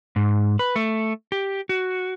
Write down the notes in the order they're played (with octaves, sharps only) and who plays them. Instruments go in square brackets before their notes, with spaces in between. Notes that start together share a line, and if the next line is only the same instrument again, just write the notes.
[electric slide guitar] G#2
B4
A3
G4
F#4